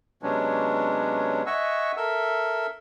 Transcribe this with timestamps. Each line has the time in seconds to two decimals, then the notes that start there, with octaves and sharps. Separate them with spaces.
0.23 C3 F#3 G#3 B3 C#4 D4
1.46 D#5 E5 F#5 G#5 C#6 E6
1.97 A4 A#4 E5 E6